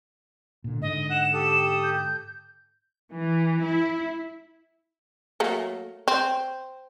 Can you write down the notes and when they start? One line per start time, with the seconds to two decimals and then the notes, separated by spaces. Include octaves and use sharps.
0.64 A#2 D3
0.82 G#2 D3 D#5
1.10 F#5 F#6 E7
1.34 G4 A4 D#6
1.83 G6
3.13 E3
3.64 E4
5.40 F#3 A3 A#3
6.08 C4